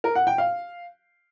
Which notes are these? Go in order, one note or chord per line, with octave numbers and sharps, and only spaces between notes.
A#4
F#5
G5
F5